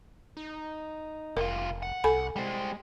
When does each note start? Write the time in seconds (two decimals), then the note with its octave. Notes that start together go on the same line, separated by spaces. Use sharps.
0.37 D#4
1.37 F1 C2 F4 A#4
1.82 F#5
2.04 C2 A4 G#5 B5
2.36 G3 G#3 C5